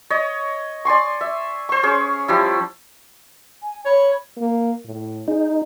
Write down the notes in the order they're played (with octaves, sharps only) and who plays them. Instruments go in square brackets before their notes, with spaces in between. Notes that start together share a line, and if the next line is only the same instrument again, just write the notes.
[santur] C#5 D#5
D5 G#5 C6 C#6
E5
C5 C#6
C#4 G#4 C#5
F3 G3 E4
[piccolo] G#5
[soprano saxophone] C#5 [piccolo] B5
[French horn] A#3
A2
[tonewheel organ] D#4 [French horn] G#4